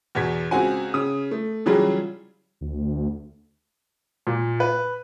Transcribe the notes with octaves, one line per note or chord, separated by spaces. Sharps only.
E2 B2 G#6 B6
C#2 C4 F#4 G#5
C#3 D#6
A3
C#3 E3 F#3 G3 F4 G#4
D2
A#2
B4